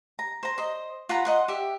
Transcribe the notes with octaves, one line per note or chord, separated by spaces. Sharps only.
A#5
C5 A#5
C5 D#5
F4 F#5 A#5 B5
D#5 F#5 C6
G4 E5